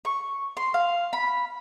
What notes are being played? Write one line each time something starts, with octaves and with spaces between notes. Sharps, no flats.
C#6
C6
F5
B5